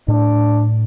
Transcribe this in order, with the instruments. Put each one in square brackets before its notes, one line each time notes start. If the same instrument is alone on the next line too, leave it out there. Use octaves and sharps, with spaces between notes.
[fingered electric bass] A2 [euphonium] D4